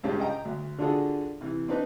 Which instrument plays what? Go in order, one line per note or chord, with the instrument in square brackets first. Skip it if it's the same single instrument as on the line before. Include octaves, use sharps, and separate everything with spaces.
[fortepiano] C#2 G2 C#3 G3
D#5 G5 A#5
D2
D3 D4 F4 F#4 G#4 A4
C3 E3
C4 D4 D#4 B4